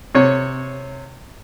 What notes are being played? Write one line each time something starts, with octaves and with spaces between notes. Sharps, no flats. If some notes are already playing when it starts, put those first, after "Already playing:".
C3 C#5